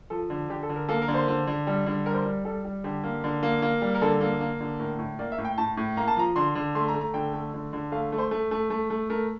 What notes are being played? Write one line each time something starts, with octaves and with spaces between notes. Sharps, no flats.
F3 A4
D3
D3 G4
A4
D3
A#4
A#3 A4
A#4
D3
C5
D3
D3
G3
D3
G3 A#4
C5
A#4
G3
G3 A4
G3
D3 G4
A#3
D3
A#3
A#3
G3
A#4
D3 A4
A#3
A#3
D3
A2 A#4
A2
A#3 D5
E5
A2
G5
A2 A5
A2
A#3 A#5
A5
F3 A#5
D3 C6
D3
A3 C6
A#5
A3
A#5
D3 G5
A3
D3
D3
A3 F5
A3
C5
A3
A3
A3
A3
A3 A#4